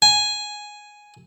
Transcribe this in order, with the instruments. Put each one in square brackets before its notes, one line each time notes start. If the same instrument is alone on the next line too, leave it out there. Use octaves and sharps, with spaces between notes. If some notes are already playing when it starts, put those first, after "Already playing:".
[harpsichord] G#5